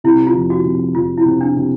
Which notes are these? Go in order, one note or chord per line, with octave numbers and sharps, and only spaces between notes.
C3 E4
F4
F2
F#4
C3
F2 F4
E4
C3
D4
C3